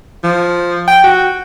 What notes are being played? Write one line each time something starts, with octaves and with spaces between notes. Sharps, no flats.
F3
G5
F#4